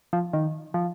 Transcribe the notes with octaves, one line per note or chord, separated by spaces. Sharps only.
F3
D#3
F3